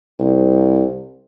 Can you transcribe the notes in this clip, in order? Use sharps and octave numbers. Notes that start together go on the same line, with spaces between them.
C2